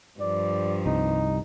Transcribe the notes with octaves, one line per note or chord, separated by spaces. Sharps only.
G2 F3 D5
C2 D#4